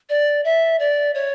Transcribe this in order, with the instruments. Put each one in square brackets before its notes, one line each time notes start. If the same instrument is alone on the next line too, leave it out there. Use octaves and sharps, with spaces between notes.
[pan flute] D5
E5
D5
C#5